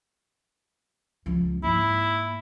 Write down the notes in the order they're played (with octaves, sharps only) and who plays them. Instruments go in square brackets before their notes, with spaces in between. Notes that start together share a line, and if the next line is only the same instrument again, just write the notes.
[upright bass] C#2 F3
[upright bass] G#2 A#3 [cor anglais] E4